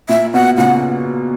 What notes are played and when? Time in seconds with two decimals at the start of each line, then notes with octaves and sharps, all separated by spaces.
0.09 A#2 E5
0.34 B2 F#5
0.57 A#2 C#3 F#5